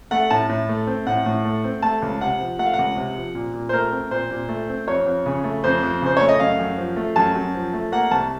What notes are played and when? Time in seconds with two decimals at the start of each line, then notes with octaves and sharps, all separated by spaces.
0.11 A3 F#5
0.30 A2 A5
0.49 A2
0.69 A3
0.87 C4
1.07 A2 F#5
1.26 A2
1.45 A3
1.64 C4
1.82 A3 A5
2.02 C#2
2.21 C3 F#5
2.40 F3
2.59 A3 F#5
2.66 F5
2.74 C#2 F#5
2.96 C3
3.16 F3
3.35 A#2
3.54 A#2
3.69 C5
3.73 A3 A#4
3.92 C4
4.11 A#2 C5
4.31 A#2
4.49 A3
4.69 C4
4.87 F2 C#5
5.06 F2
5.26 C#3
5.44 A3
5.64 F2 C5
5.83 F2
6.02 C#3 C5
6.17 A3 C#5
6.29 D#5
6.40 F#2 F5
6.59 F#2
6.78 F3
6.96 A3
7.16 F#2 A5
7.35 F#2
7.55 F3
7.74 A3
7.92 A#3 F#5
8.11 C2 A5